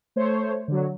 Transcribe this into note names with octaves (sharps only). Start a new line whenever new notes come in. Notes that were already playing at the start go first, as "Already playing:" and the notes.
A3 C5 C#5
D3 F#3